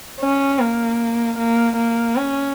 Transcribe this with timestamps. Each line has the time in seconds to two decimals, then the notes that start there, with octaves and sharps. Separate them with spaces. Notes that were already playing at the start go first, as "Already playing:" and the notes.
0.21 C#4
0.59 A#3
1.38 A#3
1.76 A#3
2.16 C#4